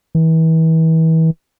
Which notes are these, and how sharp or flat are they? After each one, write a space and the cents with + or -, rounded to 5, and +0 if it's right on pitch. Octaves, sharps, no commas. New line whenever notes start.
E3 -35